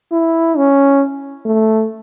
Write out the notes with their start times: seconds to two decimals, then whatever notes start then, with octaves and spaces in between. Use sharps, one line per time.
0.12 E4
0.57 C#4
1.46 A3